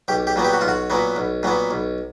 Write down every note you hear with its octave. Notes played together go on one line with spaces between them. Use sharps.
B1 G4
G4
A#2 F#3 B3
G4
F#4
B1 F4
F#4
A#2 F#3 B3
B1
A#2 F#3 B3
B1